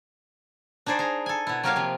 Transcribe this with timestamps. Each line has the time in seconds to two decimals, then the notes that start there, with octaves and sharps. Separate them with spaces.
0.86 D4 D#4 G#4 C5 D5
0.99 G#4 A#5
1.26 A4 G#5
1.47 B2 E4
1.63 F#3 A#3 G4 A#4 C#5 F5
1.76 C3 F3